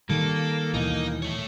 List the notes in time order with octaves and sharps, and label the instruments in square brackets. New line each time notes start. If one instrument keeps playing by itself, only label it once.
[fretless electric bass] D#3 G3 [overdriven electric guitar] A#3 [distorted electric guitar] A4
[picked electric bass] D#2 B2 E3 [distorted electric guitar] D#4
[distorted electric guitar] A3 C#5